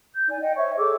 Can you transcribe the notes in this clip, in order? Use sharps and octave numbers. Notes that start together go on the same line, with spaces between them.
G6
D#4 D5 G#5
D#5 F#5 G5
C5 C#5 E5 C#6
G#4 A4 D6 E6